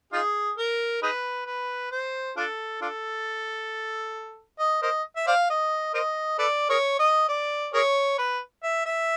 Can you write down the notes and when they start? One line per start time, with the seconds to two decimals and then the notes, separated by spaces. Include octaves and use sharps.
0.13 D#4 F4 G#4
0.57 A#4
1.03 D#4 G#4 B4
1.46 B4
1.92 C5
2.37 D4 F4 A4
2.81 D4 F4 A4
4.59 D#5
4.82 A#4 C5 D#5
5.17 E5
5.27 C5 D5 F5
5.50 D#5
5.94 A#4 C5 D#5
6.38 A4 B4 D5
6.69 G#4 A#4 C#5
6.99 D#5
7.29 D5
7.74 G#4 A#4 C#5
8.18 B4
8.63 E5
8.86 E5